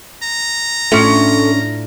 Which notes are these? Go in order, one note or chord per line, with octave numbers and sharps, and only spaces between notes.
A#5
A2 A3 C#4 D4 F4